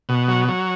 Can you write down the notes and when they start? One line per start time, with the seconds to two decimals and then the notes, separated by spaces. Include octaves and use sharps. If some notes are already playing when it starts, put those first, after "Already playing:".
0.09 B2
0.28 F#3
0.48 F#3